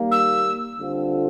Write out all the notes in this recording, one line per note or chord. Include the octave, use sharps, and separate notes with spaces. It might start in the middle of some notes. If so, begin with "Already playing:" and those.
Already playing: D#3 G3 A#3
E6
D3 G3 C4 F4 A4